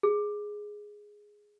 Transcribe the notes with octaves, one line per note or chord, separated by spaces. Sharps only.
G#4